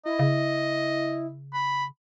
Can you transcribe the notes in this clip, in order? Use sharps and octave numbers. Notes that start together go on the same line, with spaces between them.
E4 D#5
C#3
B5